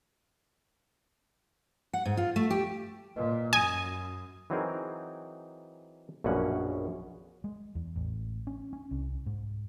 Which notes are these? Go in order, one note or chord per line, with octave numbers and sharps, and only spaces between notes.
F#5
G#2
F4
A3
G4
A#2 B4 D#5
F#2 G#5 D#6 A#6
E3 F#3 C4 D#4 G#4 A#4
A#1 F#2 B2 A#3 C#4 F#5
G#3
E2
A1
C#4
C#4
C2
G#2